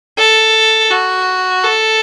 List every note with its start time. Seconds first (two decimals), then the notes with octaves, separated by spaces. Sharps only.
0.18 A4
0.91 F#4
1.63 A4